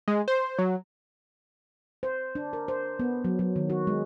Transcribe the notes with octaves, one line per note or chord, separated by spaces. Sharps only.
G#3
C5
F#3
C5
D4
A#4
C5
B3
F#3
F#3
D#3
F#4
G#3